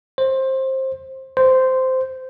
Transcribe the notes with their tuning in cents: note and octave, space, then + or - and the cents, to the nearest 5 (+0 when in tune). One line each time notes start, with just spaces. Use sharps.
C5 +20
C5 -10